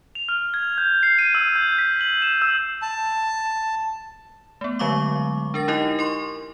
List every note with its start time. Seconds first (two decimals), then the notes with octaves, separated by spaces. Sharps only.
0.15 F7
0.29 F6
0.54 G#6
0.78 G6
1.03 C7
1.19 D#7
1.35 E6
1.56 G6
1.79 B6
2.01 F#7
2.22 E7
2.42 E6
2.82 A5
4.61 A3 B3
4.79 D3 F#3 G#3 F5 C#6 D6
5.54 D4 A#4 A6 A#6
5.68 D#4 E4 G4 A#4 D#5 G#5
5.99 A#4 C6 C#6